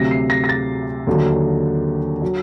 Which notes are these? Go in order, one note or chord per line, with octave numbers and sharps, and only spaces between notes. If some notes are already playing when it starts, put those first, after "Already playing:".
Already playing: D2 C3 F#3 A#6
C7
A#6
A#6
A6
D#2 D3 F#3
F#3